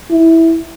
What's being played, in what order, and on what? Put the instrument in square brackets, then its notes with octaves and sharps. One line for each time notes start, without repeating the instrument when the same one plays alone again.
[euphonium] E4